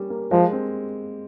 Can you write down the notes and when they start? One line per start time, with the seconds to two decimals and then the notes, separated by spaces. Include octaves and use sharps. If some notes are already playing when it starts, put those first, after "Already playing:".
Already playing: G3 A#3 C#4
0.10 A#3
0.31 F3 G#3
0.53 C4